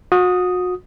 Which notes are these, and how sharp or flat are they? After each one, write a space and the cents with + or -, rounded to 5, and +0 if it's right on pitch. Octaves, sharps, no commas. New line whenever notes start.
F#4 -35 D#6 +0